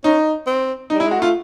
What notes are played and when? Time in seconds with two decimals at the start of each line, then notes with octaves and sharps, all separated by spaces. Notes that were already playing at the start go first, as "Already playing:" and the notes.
0.04 C#4 D#4
0.47 C4
0.90 D#4
0.94 G3
1.00 E4
1.06 G#3 F#4
1.19 A3 F4